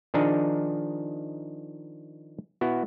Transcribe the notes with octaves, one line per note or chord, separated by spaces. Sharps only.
D#3 F3 D4 D#4 G#4
B3 E4 F#4